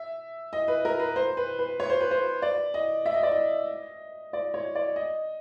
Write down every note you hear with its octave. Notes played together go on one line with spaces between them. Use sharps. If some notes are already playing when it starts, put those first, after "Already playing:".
Already playing: E5
D#5
B4
A#4
B4
C5
B4
B4
C#5
C5
B4
C5
D5
D#5
E5
D#5
D5
D#5
D5
C#5
D5
D#5